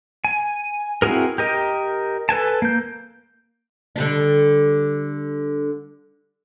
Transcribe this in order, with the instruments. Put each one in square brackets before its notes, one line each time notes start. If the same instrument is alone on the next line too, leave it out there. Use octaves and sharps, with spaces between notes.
[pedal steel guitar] G#5
C4 E4 F#4 G#4 A#4
G4 A#4 D#5
A4 B4 G#5 A5
A#3 G6
[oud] D3 G3 D4